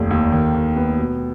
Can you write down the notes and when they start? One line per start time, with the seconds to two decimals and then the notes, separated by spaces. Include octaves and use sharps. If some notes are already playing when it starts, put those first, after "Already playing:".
Already playing: F1 D#2
0.10 D#2
0.32 D#3
0.54 D#3
0.76 B3
0.98 B2